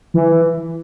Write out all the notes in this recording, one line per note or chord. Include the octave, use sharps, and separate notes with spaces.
E3